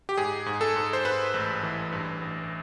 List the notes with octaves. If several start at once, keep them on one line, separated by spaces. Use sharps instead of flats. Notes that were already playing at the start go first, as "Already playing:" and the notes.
G4
G#2 G#4
G#2
A4
G#2
C5
G#2 B4
A1
E3
G2
A1